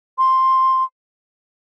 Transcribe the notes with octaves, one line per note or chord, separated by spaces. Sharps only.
C6